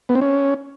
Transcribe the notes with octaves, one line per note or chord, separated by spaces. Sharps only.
B3
C4
C#4